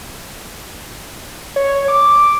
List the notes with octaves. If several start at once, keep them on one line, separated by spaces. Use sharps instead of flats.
C#5
D6